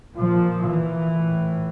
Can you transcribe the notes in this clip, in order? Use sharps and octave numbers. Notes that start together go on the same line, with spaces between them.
A#2 F3
E3
A2